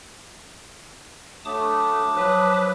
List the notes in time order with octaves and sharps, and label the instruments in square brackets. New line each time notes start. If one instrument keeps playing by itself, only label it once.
[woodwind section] F#3 D4 [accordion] A3 [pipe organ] A5 D6 D#6
[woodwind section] F3 F#3 [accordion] B4